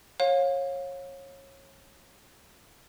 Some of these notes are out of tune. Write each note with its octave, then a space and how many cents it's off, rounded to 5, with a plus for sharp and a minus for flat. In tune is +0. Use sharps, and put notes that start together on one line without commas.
C#5 -25 F5 +25